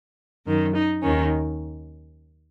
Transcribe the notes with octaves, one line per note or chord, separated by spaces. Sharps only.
F#2 D#3
D#4
D#2 D#3 C#4